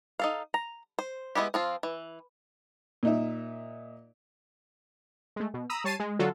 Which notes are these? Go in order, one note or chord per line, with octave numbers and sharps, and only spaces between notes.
D#4 A4 F5
A#5
C5
G#3 B3 E4 G4
F3 C4 F4
E3
A#2 D#4 E5
G#3 A3
B2
A#5 B5 D#6 E6
G3 C#5 A5 A6 C7 D#7
G#3
D3 F#3 D4 F4 F#4 A4